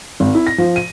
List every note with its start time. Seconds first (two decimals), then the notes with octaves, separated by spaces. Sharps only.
0.20 G#1
0.34 E4
0.47 A#6
0.58 F3
0.76 D#7